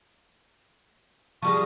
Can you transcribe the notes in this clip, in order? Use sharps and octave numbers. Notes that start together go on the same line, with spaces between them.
F3 G3 G#3 C#6